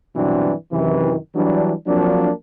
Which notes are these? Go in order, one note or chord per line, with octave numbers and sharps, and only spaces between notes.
G2 B2 E3 F#3 C4 D4
F#2 C3 D#3 E3
E3 F#3 G3 D4
F3 F#3 A#3 C4 D4